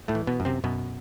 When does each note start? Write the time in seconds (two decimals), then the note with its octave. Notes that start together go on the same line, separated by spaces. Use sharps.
0.08 A2 A3
0.15 E3
0.27 B2 B3
0.40 F#2
0.45 C3 C4
0.64 F#2 B2 B3